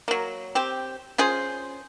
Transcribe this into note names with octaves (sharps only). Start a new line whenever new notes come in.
F#3 A#3
C4 G4
C#4 F4 G#4 C5